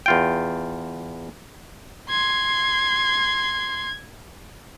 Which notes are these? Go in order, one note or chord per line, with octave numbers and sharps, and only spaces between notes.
E2 F4 G5
C6 G#6